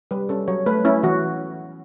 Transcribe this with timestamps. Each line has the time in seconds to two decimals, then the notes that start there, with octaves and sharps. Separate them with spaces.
0.11 G3 B4
0.29 C#4 A4
0.48 F#3 C#5
0.66 A3 B4
0.85 C#4 E4
1.03 E3 F#4